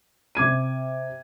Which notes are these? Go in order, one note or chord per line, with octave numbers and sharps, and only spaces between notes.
C3 D6 G#6 D#7